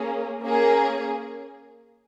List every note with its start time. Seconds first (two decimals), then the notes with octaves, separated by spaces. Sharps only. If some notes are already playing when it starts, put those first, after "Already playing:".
Already playing: A#3 C#4 G#4
0.41 A#3 C#4 G#4